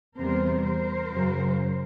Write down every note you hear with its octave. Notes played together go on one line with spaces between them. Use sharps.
E2 C3 E3 G3 B3 A#4 C5
A#4 C5
F#2 C#3 F#3